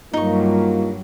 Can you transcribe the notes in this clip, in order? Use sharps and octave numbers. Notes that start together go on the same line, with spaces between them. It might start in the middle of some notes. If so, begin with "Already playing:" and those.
G2 F#3 A#3 D#4 F4 C#6